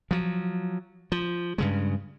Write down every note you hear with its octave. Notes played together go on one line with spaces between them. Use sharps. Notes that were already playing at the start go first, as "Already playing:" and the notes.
F3 F#3
F3
G2 C#3 G#3